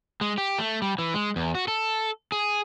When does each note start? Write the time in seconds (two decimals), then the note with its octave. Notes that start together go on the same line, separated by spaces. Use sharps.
0.21 G#3
0.38 G4
0.58 A3
0.82 G3
0.99 E3
1.14 G#3
1.36 E2
1.55 F#4
1.68 A4
2.32 G#4